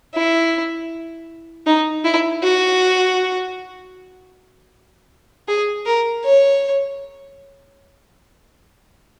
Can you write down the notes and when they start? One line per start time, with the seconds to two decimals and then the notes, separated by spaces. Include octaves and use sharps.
0.14 E4
1.66 D#4
2.04 E4
2.43 F#4
5.48 G#4
5.86 A#4
6.24 C#5